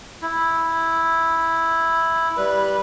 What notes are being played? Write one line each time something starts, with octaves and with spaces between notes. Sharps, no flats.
E4
G3 B4